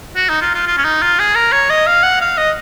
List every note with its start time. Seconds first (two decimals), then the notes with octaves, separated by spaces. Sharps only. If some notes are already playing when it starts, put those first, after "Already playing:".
0.16 F#4
0.29 D#4
0.41 F4
0.54 F4
0.67 F4
0.78 C#4
0.85 D#4
1.02 F4
1.19 G#4
1.35 A#4
1.52 C#5
1.70 D#5
1.87 F5
2.03 F#5
2.21 F5
2.38 D#5